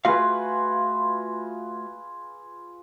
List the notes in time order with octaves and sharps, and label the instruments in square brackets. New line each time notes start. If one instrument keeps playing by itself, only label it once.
[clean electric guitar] A3 F#4 F5 [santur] F4 G#4 B4